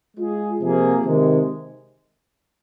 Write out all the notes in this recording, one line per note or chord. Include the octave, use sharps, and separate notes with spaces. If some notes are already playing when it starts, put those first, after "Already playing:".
G#3 F4 G#4
C3 F3 A#3 G#4
C3 D#3 G#3